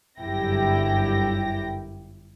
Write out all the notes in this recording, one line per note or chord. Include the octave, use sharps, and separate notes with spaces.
G1 F#2 E4 G4 G5 A#6